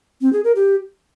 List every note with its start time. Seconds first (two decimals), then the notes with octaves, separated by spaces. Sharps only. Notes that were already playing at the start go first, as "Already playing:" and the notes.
0.21 C4
0.33 G#4
0.44 A#4
0.56 G4